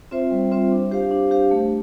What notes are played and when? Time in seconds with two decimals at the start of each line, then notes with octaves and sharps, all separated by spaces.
0.11 C4 F4 C5 E5
0.31 G3
0.52 C4 F4 C5 E5
0.72 D4
0.91 G4 C5 F5
1.11 D4
1.31 G4 C5 F5
1.51 A3